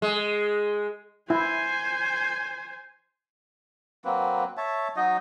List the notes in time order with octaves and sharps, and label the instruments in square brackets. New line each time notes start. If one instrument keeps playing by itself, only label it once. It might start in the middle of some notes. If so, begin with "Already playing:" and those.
[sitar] G#3
[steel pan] E4 [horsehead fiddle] C5 G#5
[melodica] F#3 A#3 C4 B4
C#5 E5 A5
F#3 D#4 D#5